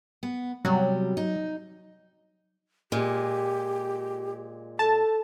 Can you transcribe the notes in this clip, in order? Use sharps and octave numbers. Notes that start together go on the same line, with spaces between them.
B3
C3 F#3 G3
D#4
A#2 G#3 G4
A4 A5